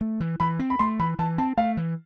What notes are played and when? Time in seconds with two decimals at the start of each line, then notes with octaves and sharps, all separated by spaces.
0.01 A3
0.20 E3
0.40 E3 B5
0.59 C4
0.70 B5
0.79 A3 C6
0.99 E3 B5
1.19 E3 A5
1.38 C4 A5
1.57 A3 F5
1.77 E3